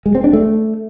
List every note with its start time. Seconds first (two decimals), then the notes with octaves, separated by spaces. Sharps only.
0.06 G#3
0.15 C4
0.24 D4
0.33 A3